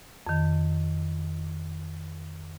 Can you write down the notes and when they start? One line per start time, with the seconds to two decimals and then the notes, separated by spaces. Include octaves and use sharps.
0.27 F2 D#3